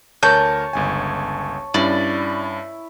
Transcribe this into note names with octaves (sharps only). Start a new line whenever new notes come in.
D2 A#4 C#5 A5 G6
G1 C#2 G#5
G2 C#4 E4 D5